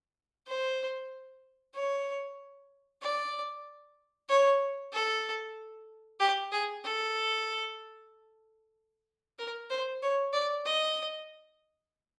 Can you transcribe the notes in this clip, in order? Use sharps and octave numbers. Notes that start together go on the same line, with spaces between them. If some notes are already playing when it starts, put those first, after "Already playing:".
C5
C#5
D5
C#5
A4
G4
G#4
A4
A#4
C5
C#5
D5
D#5